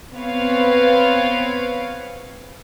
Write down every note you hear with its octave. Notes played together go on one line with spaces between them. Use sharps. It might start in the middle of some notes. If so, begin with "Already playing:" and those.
B3 C4 B4 C#5 F5